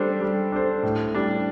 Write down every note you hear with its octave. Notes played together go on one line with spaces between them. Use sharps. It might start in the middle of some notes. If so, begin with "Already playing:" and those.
Already playing: G3 D4 A4 C5
G3
D4 A4 C5
A2
G3 D4